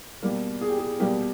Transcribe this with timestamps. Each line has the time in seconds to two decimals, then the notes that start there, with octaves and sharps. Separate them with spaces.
0.23 B2 G3 A#3
0.61 G#4
0.70 G4
0.78 G#4
1.00 B2 G3 A#3 G4